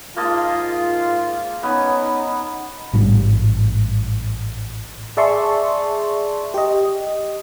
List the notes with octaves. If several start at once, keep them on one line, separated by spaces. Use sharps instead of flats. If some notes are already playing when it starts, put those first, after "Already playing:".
G#2 A#3 F4 D#5 A5
B3 C#4 D#4
A1 G#2 G3
G#4 D5 E5 A5 C6 C#6
G4 D#5